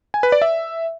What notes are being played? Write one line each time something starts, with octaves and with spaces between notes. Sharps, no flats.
G#5
B4
D5
E5